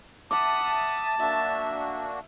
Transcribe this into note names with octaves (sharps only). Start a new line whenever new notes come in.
E5 F#5 A5 D6 D#6
A#3 D4 F#4 E5